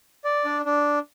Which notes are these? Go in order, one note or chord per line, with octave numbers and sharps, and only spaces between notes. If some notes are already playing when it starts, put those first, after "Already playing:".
D5
D4
D4